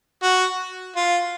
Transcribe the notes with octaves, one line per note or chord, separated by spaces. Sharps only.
F#4
F4